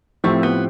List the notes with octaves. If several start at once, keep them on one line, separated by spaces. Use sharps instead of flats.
A2 F3 A3 C4 G4
B3